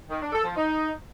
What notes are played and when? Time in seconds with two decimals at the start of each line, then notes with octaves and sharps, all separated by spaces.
0.10 D#3
0.21 D4
0.32 A4
0.44 F3
0.55 D#4